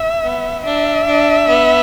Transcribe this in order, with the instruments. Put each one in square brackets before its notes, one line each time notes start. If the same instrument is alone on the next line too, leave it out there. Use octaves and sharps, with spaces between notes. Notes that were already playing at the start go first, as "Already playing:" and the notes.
Already playing: [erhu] E5
[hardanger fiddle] B3
[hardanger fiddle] D4 [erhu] E5
[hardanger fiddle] D4
B3